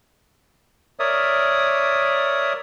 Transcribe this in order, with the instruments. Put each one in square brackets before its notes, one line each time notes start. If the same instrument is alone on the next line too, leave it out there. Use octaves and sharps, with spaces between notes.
[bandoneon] A#4 C#5 D5 E5 D#6